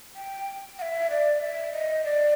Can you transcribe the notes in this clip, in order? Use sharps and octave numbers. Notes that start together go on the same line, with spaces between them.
G5
F#5
E5
D5
E5
D#5
D5